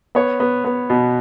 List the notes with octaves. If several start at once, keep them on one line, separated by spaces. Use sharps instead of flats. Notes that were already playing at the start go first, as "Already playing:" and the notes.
B3 C#5
B3
B3
B2